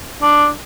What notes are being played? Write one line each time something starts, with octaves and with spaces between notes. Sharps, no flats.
D4